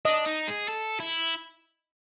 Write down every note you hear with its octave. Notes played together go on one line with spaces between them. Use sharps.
D4 D#5
D#4
G#4
A4
E4